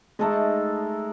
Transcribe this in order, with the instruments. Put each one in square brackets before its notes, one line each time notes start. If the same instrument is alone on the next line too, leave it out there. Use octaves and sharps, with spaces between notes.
[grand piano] G#3 [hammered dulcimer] A3 D#4 A4 D#5